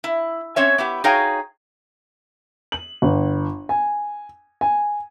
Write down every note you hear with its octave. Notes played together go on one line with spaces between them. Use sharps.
E4
C4 C#4 C#5 E5
B3 E4 G4
D#4 F#4 G#4 C#5 F5 G5
F#7
G1
G#5
G#5